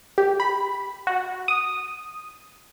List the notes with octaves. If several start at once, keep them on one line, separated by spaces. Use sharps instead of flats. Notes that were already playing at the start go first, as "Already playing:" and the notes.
G4
B5
F#4
D#6